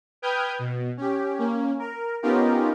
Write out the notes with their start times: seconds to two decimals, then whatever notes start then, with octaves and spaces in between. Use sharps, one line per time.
0.22 B4 G5 D#6 F6 G6 G#6
0.59 B2
0.97 C#4 G4
1.39 A#3 C#4
1.79 A#4
2.22 B3 C#4 D#4 F4 G4 A#4